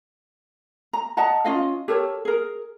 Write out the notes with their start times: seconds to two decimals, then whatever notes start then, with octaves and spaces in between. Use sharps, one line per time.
0.93 A#5
1.17 D#5 F#5 A5 A#5
1.45 C#4 F4 D#5 F5
1.88 G4 A4 A#4 C#5
2.25 G#4 A#4